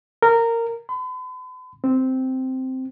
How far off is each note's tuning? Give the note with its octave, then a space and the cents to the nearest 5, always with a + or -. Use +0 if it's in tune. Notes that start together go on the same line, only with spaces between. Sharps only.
A#4 -15
B5 +45
C4 -5